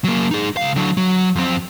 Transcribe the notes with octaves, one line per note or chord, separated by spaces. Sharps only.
F#3 A#3
D#4 G#4
C#2 F5
D3 F#3
F#3
F2 C4